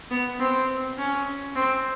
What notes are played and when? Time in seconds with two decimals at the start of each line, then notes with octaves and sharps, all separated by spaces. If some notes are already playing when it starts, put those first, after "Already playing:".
0.10 B3
0.39 C4
0.98 C#4
1.56 C4